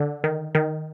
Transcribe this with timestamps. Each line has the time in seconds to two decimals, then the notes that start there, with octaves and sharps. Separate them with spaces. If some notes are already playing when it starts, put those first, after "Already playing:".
Already playing: D3
0.24 D#3
0.55 D#3